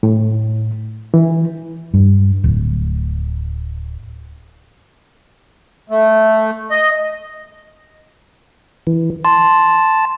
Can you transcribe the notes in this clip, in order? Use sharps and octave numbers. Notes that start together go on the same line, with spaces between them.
A2
E3
G2
D1
A3
D#5
E3
A5 C6